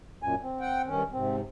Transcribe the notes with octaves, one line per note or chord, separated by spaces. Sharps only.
F#2 A#2 G#5
C4
F#5 G5
G2 D#3 C#4
G#2 C3 C4